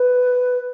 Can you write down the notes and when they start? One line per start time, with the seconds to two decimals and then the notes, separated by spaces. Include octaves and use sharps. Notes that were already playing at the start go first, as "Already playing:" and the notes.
Already playing: B4